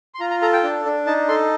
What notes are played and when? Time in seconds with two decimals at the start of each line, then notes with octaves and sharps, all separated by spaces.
0.14 C6
0.20 F4 A#5
0.31 A#5
0.42 A4 A#5
0.53 G5
0.63 D4
0.85 D4
1.07 D#4 A5
1.28 A4 C6